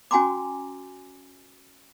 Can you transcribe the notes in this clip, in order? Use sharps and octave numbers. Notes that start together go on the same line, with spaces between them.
C#4 F#4 G#5 A#5 C6 D6